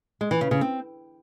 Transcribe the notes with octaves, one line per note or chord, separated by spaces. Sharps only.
G#3
E3
C#3
C#3
C4